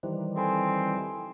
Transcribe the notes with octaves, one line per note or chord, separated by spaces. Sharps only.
D#3 E3 G3 C5
C4 A4 G#5 B5